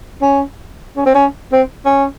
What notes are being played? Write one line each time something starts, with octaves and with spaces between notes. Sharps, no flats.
C#4
C#4
C4
C#4
C4
C#4